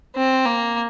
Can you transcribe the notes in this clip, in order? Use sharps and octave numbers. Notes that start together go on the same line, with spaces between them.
C4
A#3